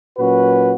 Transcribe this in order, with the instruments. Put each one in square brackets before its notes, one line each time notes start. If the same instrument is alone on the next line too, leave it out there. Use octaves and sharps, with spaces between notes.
[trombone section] A#2 F#3 C#4 F#4 B4